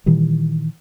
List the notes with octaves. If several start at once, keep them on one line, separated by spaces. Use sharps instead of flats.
A#2 D#3 E3 G3